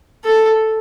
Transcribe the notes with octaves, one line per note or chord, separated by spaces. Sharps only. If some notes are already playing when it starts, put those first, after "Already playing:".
A4